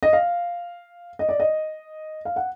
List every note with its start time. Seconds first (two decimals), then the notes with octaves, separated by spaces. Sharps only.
0.03 D#5
0.13 F5
1.19 D#5
1.29 D5
1.40 D#5
2.25 F5
2.36 F#5